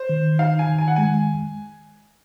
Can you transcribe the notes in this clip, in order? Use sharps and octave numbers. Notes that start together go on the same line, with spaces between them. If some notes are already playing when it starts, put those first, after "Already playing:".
Already playing: C5
D#3
D#4 F5
G#5
D#3
G#5
F#5
G#3 G#5